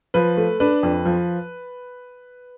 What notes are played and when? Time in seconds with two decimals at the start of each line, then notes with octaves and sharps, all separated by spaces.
0.14 F3 B4
0.37 A3
0.60 D4 B4
0.83 F2
1.05 F3